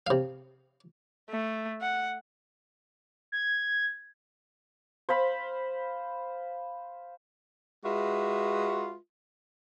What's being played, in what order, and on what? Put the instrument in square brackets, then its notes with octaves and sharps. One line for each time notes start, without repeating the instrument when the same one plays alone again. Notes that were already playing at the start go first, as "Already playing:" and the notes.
[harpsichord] C3 F5
[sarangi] A3
F#5
[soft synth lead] G#6
[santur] C5 F5 B5
[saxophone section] G#3 F4 F#4 B4 E5